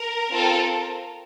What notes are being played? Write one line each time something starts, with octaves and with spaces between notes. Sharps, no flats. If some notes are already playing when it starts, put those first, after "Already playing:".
Already playing: A#4
C4 F4 A4